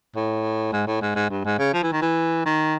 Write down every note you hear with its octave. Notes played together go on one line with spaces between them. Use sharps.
A2
G#2
A2
G#2
G#2
G2
G#2
C#3
F3
E3
D#3
E3
D#3